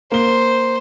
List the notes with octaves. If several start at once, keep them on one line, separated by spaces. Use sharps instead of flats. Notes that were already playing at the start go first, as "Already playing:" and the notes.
A#3 C5 G7